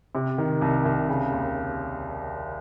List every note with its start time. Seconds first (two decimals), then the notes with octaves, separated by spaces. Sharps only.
0.15 C3
0.38 D#3
0.62 C2
0.85 C2
1.09 C#3
1.32 D#2